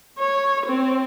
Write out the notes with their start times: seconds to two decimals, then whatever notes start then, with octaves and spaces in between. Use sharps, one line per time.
0.19 C#5
0.66 C4